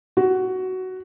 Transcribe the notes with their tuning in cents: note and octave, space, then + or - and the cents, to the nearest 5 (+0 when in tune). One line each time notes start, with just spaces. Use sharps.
F#4 +10